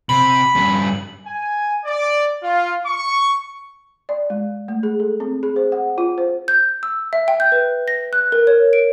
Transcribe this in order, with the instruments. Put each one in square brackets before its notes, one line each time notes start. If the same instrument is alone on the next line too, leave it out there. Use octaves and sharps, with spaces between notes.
[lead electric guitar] C3 [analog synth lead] B5 [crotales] F#7
[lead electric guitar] G2 C#4
[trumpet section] G#5
D5
F4
C#6
[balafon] D5
G#3
A3
G#4
A4
C4
G#4
C5
F#5
F4
C5
[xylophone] G6
E6
E5
G5
G6
B4
A#6
F#6
A#4
C#5
D7